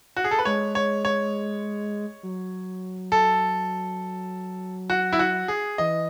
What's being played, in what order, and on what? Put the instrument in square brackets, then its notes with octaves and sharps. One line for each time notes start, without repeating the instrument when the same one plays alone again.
[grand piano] F#4
G#4
A4
B4
[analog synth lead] G#3 [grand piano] C#5
[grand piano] C#5
C#5
[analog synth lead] F#3
[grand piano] A4
F#4
E4
F#4
G#4
[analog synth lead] E3 [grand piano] D#5